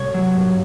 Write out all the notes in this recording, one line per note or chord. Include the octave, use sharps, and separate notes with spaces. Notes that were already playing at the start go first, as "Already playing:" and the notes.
Already playing: C2 C#5
F#3
G2